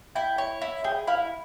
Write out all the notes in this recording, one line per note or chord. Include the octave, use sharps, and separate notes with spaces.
E4 G5
C#5
E4
G#4 G5
E4 F5